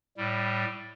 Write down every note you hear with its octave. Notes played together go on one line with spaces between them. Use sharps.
A2 G3